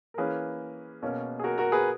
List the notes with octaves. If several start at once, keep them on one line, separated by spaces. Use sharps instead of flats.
A#4
E3 A#3 C#4 G#4 B4
B2 A#3 C#4
G#4
F#4 A#4
F#4 A#4
G#4 B4